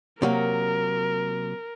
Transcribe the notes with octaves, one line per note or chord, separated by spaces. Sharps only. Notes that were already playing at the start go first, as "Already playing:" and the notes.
C3 F#3 A#3 A#4